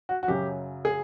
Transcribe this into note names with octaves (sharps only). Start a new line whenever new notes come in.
F#4
F#4
F#2 C#3 F#3 G4
G#4